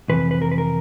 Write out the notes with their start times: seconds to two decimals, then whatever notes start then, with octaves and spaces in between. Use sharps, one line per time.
0.09 F2 C3 E3 B4
0.31 B4
0.42 A#4
0.51 B4
0.58 A#4